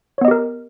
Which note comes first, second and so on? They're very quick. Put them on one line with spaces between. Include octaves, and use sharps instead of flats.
C#5 B3 D#5 G4 A#4